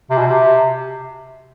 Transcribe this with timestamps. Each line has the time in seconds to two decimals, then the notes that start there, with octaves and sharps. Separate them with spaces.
0.10 C3
0.18 B2
0.27 C3